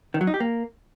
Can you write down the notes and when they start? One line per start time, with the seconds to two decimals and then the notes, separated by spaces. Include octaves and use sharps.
0.14 D#3
0.21 F#3
0.27 D#4
0.34 G4
0.40 A#3